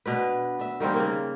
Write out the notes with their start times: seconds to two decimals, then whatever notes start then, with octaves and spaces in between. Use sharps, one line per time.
0.06 B2 D4 B4
0.59 D4 E5
0.80 D#3 G3 A#3 C4
0.96 C#3 A#3